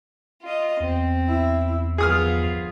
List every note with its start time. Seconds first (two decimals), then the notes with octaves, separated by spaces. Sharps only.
0.42 F4 D#5
0.80 E2 C4
1.28 E4
1.98 G1 F3 B3 F4 G#4 D#6 F6